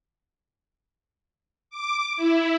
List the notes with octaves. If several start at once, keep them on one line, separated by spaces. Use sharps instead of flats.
D6
E4